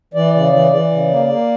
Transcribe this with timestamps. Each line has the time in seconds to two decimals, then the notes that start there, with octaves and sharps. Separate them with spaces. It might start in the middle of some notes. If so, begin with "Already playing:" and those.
0.14 E3 D5
0.33 C#3 D5
0.52 E3 D5
0.71 E3 D5
0.91 C#3
1.09 A#3
1.29 A#3